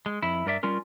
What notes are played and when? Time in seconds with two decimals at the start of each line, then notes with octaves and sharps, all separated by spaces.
0.06 G#3
0.23 F2 E4
0.46 G2 A#4 D5 E5
0.63 G3 C#4 F4 A#4